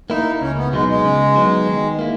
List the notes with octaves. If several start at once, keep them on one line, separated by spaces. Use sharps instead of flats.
A#3 D#4 E4
C#2 C#4
B3
B2 F#3 G#3 B3 D#4
G#3
C#3
F#3 B3 D#4
D#3
A#3 E4